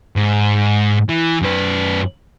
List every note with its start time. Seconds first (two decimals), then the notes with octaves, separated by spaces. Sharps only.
0.16 G#2
1.09 E3
1.41 F#2 B4